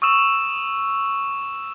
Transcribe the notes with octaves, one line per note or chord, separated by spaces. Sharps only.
C#6 D#6 E6 E7